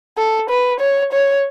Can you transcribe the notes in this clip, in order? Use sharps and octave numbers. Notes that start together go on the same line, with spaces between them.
A4
B4
C#5
C#5